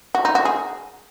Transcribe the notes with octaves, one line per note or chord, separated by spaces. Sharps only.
F#4
D#4
F#4
G#4